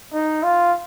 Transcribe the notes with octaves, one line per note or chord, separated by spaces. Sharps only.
D#4
F4